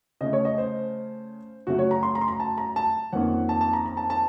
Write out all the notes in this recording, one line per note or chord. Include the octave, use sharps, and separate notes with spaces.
C#3 A3 C#4 D#5
C#5
D#5
C5
F#2 C#3 F#3 A3 C#4 F#4
C#5
A#5
C6
A#5
C6
A#5
A5
A#5
A5
F2 D#3 A#3 C#4 F#5
A5
A5
A#5
A#5
A5
A5